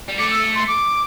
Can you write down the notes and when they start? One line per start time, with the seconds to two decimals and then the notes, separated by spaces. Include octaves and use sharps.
0.09 G3
0.19 A3 D6
0.31 E6
0.55 C6
0.68 D6